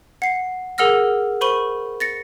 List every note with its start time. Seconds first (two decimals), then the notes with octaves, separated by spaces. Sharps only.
0.22 F#5 C7
0.78 G#4 A#4 F#5 E6 F6 A#6
1.41 A#4 C5 B5 C#6 D#7 G7
2.00 A6 A#6 C#7